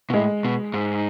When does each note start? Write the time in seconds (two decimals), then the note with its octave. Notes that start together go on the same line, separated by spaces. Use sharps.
0.10 B2
0.14 A2 G#3
0.45 B2
0.74 G#2